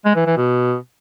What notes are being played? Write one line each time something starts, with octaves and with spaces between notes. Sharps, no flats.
G#3
E3
E3
B2